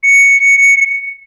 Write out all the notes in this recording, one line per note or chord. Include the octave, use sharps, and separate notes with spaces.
C#7